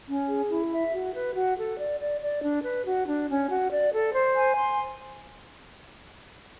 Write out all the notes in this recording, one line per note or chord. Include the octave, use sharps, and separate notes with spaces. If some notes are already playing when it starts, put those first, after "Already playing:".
C#4
G#4
E4
E5
F#4
B4
F#4
A4
D5
D5
D5
D4
B4
F#4
D4
C#4
F#4
D5
A4
C5
G#5
C6